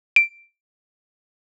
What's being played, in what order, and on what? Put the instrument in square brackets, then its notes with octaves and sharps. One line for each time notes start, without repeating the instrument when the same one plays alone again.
[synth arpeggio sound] D7